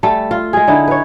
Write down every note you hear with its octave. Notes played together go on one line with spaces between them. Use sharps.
G3 A3 A4
F4
G#3 G#4
D3 D#4 E4
B4 C#5